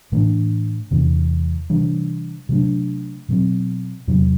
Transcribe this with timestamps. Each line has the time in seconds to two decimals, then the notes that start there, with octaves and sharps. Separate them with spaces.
0.12 A2 E3 A3 D4
0.91 E2 C3 E3
1.70 C3 E3 G3 D4
2.49 C3 F#3 A3 D4
3.29 B2 F#3 C4
4.07 E2 C3 F#3